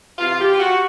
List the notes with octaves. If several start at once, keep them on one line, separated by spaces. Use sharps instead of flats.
C3 E3 F4
G4
F4
F#4